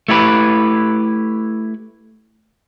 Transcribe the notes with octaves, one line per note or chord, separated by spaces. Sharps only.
A3 E4 G4 B4